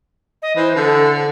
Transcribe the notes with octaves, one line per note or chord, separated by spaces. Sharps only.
D#5
E3 C5
D3 A4